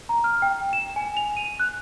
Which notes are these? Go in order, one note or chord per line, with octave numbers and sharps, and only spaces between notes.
A#5
F6
G5
E7
G#5
F7
D#7
F#6